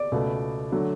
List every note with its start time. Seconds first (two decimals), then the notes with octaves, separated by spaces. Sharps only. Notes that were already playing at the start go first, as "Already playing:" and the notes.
Already playing: D5
0.12 C#2 B2 A3
0.72 D3 F#3 A3